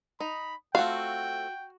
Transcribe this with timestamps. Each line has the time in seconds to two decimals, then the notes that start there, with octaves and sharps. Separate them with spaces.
0.20 D#4 B5
0.75 A3 C4 F4 F#4 F5 G5